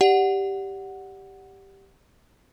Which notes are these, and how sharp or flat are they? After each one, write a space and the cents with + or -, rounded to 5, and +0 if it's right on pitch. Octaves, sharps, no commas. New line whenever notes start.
G4 +0 D5 +0 F#5 +0